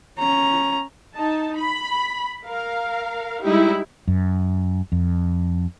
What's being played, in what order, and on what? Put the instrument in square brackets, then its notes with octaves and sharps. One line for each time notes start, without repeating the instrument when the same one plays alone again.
[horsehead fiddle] C#4 A#5
[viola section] D#4 A5
B5
A#4 F5
G3 G#3 D#4 E4 G4
[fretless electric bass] F#2
F2